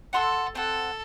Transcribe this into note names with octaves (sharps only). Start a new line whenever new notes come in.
A4 F#5 C6 E6
C4 A4 F#5